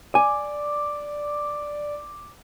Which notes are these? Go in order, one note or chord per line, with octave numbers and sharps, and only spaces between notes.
D5 G#5 D6